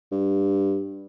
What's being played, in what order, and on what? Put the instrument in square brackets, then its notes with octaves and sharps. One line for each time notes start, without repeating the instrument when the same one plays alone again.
[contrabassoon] G2